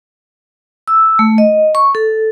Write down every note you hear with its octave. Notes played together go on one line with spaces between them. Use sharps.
E6
A3
D#5
C#6
A4